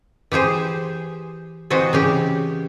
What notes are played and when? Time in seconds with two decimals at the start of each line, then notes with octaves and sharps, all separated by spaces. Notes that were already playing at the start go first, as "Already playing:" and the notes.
0.32 E3 G4 G#4 C5
1.70 C3 E3 F#4 C5 D#5
1.93 C#3 E3 G4